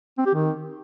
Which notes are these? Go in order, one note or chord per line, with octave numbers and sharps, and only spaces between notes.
C4
G4
D#3